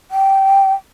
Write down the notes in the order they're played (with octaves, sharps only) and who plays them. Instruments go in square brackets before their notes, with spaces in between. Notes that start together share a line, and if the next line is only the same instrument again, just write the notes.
[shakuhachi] G5